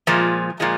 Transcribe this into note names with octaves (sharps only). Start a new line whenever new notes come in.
A#2 F3 G#3
A#2 F3 G#3